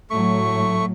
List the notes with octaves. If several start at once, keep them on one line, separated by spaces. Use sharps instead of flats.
A2 F#3 A3 C#6